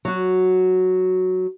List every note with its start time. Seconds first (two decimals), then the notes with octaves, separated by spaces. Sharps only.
0.05 F#3 F#4